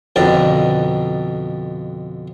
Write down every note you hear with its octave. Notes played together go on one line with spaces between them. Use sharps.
F2 B2 D3 D5 G5 A#5